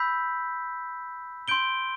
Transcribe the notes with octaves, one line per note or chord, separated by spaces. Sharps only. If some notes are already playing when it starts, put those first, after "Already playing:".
Already playing: B5 E6 G6 B6
C6 G6 D7 G7